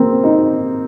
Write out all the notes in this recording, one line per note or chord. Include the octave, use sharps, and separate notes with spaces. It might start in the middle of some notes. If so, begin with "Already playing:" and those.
Already playing: A#3 C4
D#4